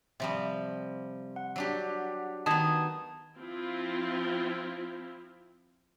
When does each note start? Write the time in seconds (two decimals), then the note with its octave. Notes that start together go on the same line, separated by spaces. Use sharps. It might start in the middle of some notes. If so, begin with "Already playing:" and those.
0.20 C3 F3 G3
1.36 F#5
1.56 F#3 D4 G4
2.46 D#3 B3 A5 D#6 G#6
3.38 F3 C4 E4 F4